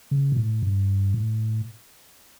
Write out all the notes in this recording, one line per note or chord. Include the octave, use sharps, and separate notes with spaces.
C#3
B2
A2
G2
A2